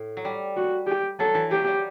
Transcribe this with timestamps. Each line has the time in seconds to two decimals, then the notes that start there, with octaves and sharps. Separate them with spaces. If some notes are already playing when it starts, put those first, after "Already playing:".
Already playing: A2
0.17 F#3
0.25 G3
0.57 F#4
0.87 G4
1.20 F#3 A4
1.34 E3
1.51 F#3 G4
1.67 G3